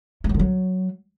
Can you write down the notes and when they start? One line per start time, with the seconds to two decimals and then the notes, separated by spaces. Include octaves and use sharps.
0.24 A3
0.29 F#3
0.34 D3
0.39 F#3